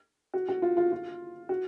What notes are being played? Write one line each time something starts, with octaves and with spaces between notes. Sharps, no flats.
F#4
F#4
F4
F4
F4
F#4